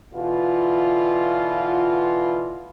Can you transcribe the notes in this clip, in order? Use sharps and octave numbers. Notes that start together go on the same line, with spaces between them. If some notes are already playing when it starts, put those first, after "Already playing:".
B2 D3 E3 F4